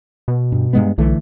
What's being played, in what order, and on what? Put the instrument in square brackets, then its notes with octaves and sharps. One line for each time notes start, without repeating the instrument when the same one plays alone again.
[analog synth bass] B2
[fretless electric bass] G2
G2 G#3 B3
[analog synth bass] B1 [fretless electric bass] D3 E3 A3